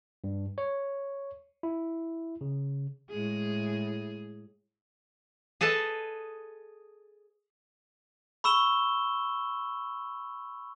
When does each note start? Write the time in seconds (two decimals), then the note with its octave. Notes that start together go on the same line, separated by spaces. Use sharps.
0.24 G2
0.58 C#5
1.63 E4
2.41 C#3
3.10 A2 G#3 G#4
5.61 G#4 A4 B4 D#5 A5
8.44 B5 C#6 E6 E7 G7